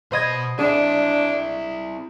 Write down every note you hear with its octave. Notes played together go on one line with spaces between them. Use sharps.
B2 C5 D#5 B5 G#6
C4 D4 E4 G#4